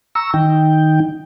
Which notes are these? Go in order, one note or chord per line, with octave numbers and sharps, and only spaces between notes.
A#5 C#6 E6
D#3 D#4 G5